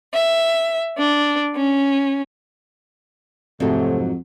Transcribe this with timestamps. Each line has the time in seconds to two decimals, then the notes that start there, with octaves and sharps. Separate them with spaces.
0.13 E5
0.97 D4
1.55 C#4
3.60 F2 G#2 C3 F#3 A3